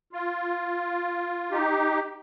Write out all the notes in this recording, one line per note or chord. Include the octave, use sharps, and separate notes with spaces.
F4
D#4 G4